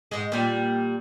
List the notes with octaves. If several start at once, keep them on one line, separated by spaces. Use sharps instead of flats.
G#2 G#3
A#2 G3